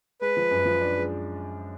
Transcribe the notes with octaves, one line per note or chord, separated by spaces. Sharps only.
G#3 B4
F3
F#2
F3
D4
G#3